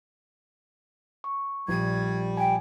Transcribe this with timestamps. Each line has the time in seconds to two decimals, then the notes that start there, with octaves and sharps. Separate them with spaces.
1.24 C#6
1.68 A#1 G3 G#6
2.37 G5 G#5